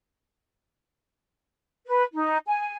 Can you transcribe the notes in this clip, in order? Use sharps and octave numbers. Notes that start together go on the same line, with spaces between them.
B4
D#4
G#5